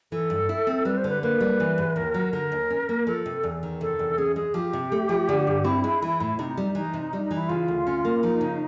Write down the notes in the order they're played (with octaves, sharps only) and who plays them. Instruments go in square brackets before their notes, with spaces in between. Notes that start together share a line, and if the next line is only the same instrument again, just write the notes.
[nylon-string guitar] E3 [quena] A4
[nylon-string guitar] G2
E4
C4
[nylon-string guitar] G3 [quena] B4
[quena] C5
[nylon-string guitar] D3 [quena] B4
[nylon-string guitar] A#3 [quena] B4
[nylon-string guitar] G3
E3
G#2
[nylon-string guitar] D#2 [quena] A#4
[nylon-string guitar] F#3
[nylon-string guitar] D3 [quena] A#4
[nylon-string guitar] D#2
C#4
A#3
[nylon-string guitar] F3 [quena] A4
[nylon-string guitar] C3
E2
D#3
[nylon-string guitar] C3 [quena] A4
[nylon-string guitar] E2
[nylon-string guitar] C#4 [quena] G#4
[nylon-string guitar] G#3 [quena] G#4
[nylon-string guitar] F3 [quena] G4
[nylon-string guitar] C3
A3
F3
D3
G2
[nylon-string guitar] C4 [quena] E4
[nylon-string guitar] G#3
E3
A2
[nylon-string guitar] C3 [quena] D#4
[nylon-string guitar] G3
[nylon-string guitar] E3 [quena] D#4
[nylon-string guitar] C3
G3
[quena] D#4
[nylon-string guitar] E3 [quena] E4
[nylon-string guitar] C#3 [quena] F4
[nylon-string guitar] D2
C#4
A#3
[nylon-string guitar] F3 [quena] D#4
[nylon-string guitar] C#3